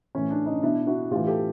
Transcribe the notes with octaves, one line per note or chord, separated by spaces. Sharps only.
A2 E3 C#4
D4
C#4 D#4
B2 D4 E4
E4 F#4
A2 E3 F4 G4
G4 A4